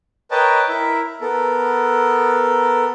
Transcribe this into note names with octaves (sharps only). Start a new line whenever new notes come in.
A#4 B4 C#5 D#5 G5 A5
E4 A#4 E5
B3 A4 A#4